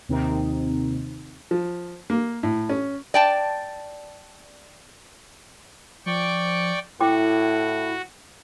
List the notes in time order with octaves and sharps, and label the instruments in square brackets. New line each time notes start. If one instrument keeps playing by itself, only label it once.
[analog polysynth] D#2 C3 D#3 C4 D#4
[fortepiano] F3
A#3
A2
C#4
[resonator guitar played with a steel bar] D5 G5 A5
[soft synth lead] F3 [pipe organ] D5 G5 C#6
[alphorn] A2 [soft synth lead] E4 [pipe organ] F#4 [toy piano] G5 D6